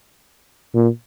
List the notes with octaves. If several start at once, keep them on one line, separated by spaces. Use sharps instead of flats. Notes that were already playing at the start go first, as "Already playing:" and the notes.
A#2